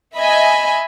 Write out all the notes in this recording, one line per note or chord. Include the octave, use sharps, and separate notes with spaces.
D#5 E5 G#5 B5